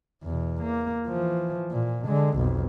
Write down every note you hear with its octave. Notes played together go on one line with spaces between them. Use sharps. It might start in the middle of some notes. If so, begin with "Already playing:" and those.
E2 B2
A#3
E3 F3
A#2
D3 G#3
B1 F2